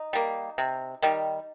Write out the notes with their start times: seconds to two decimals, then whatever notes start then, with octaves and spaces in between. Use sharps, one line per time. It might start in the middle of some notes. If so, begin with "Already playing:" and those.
Already playing: D#4
0.13 G3 A#3
0.58 C3
1.02 D#3 G3